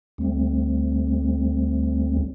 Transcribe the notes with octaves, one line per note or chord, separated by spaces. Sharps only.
D2 G3 A3 C4